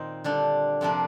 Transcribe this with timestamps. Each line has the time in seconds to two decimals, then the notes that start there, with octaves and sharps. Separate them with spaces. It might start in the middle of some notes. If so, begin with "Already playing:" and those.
Already playing: A#2 D#3 C4 D#4
0.24 D3 G3 D4
0.81 F2 C3 F3 A#3 D4